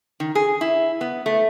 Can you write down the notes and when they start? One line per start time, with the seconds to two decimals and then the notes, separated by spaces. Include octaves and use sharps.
0.20 D#3
0.35 G#4
0.61 E4
1.01 B3
1.26 A3